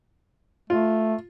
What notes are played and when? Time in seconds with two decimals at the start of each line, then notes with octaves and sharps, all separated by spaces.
0.70 A3 F4